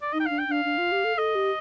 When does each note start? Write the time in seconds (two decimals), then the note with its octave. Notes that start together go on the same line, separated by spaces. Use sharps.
0.02 D5
0.13 D#4 D#5
0.20 G5
0.26 D4 F5
0.39 G5
0.48 D4 F5
0.65 D4
0.78 F4
0.92 G4
1.04 A4
1.17 A4 D#5
1.35 G4